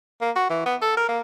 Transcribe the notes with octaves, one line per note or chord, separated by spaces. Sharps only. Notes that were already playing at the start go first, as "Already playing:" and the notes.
A#3
F#4
E3
B3
A4
A#4
A#3